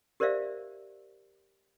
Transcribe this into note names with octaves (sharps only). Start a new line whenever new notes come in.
G4 A#4 C5 D5 E5 F5